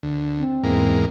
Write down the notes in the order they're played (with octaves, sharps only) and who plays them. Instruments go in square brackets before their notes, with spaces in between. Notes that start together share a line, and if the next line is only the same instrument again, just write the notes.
[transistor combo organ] D2
[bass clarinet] C4
[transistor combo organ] E2 G#2 A#3